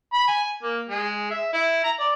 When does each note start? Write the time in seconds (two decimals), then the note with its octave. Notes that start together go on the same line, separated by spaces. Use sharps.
0.13 B5
0.27 G#5
0.63 A#3
0.89 G#3
1.31 E5
1.53 E4
1.84 A#5
1.99 D5